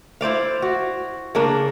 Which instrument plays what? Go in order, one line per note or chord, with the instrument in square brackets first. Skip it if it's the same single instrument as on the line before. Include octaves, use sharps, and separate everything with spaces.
[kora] E4 C5 D5 F5
F#4
C#3 A#3 D4